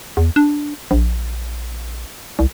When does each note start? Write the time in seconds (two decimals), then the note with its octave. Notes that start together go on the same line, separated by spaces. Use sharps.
0.17 E2
0.36 D4
0.91 A#1
2.39 C2